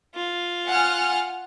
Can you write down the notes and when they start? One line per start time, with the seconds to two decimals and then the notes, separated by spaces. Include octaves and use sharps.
0.14 F4
0.68 F#5 G#5 F6